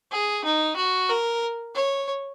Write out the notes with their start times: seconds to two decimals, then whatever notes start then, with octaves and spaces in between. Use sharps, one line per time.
0.12 G#4
0.44 D#4
0.76 F#4
1.09 A#4
1.75 C#5